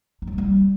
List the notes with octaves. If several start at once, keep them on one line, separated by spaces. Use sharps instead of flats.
D#4
F#3
A#3
G3